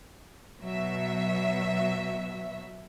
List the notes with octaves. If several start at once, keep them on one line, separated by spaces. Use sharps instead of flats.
B2 F#3 E5